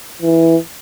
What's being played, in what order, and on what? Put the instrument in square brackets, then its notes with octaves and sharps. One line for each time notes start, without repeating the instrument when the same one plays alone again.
[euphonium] E3